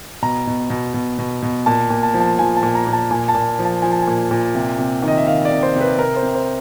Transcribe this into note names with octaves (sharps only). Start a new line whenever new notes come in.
B2 A#5
B2
B2
B2
B2
B2
A#2 A5
A#2
A5
F3
A5
F3 G#5
A5
A#2
A#5
A#2
A5
A#2 G#5
A5
A#2
F3
A5
F3 G#5
A5
G#5
A#2
A#2
C3
C3
D#3
D#5
E5
D#3 F5
D5
C3
C5
C3
B4
C3 A#4
C5
C3
C5